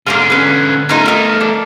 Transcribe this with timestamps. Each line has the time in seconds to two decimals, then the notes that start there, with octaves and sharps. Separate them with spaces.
0.07 G#2 D3 A#3 F4 F5
0.30 C#4 B4
0.89 A3 C#4 D#4 F4 A#4
1.06 A#3 D#4
1.41 D4